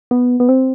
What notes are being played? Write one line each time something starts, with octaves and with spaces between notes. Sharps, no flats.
B3
B3
C4